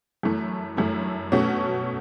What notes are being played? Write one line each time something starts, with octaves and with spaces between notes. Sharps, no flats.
F#2 E3 A3 E4
F#2 E3 A3 E4
B2 A3 C#4 F#4